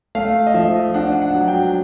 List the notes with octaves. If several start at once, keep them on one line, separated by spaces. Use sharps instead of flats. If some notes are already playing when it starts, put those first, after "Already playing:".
A3 F5
D#5
F3 E5
D4 F#5
F#5
F#3
G5